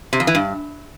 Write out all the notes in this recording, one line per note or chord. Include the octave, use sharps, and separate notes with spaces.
C3
F2
E3
G2